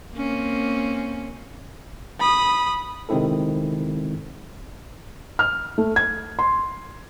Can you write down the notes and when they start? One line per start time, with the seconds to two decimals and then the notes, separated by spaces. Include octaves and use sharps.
0.14 A#3 C4 C#4
2.20 B5 D#6
3.09 C3 D#3 G#3 C4 E4 A4
5.39 F6
5.78 A3
5.96 G#6
6.39 C6